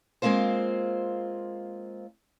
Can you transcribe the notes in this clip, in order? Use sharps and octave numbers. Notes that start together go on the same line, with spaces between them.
G#3 A#3 C4 F4 C5